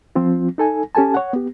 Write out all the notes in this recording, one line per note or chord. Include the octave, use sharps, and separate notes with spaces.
F3 C4 F4
D#4 A4 G#5
C#4 G4 A4 G#5 A5
C#5 F#5
B3 G4